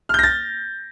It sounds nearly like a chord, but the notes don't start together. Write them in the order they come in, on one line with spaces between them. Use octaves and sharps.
F6 G6 A#6 A6